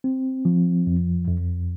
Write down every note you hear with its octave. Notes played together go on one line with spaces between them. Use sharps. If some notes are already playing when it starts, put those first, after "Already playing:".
C4
F3
F2
F2